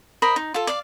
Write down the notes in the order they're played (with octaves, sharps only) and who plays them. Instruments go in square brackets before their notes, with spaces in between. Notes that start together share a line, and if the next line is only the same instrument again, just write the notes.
[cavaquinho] A#4 C5 D#5 B5
D#4
F4 A4
D5 F5